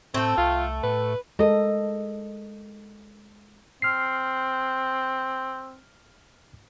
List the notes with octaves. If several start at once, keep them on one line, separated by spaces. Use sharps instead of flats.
A2 A3 C4 G5
C2 F4
A2 B4
G#3 A4 A#4 D#5
C4 F6 C7